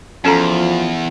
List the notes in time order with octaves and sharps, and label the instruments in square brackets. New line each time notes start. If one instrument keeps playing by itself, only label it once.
[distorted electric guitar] E2 [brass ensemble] F3 F4 [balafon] C#4 A4 A#5